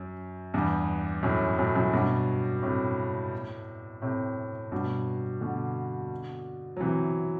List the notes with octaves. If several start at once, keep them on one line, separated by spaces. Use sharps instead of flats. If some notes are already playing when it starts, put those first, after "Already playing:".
Already playing: F#2
E2 G2
F#2 A2
F#2 A2
F#2 A2
G2 B2
A2 C3
A2 C3
G2 B2
B2 D3
F#3
C3 E3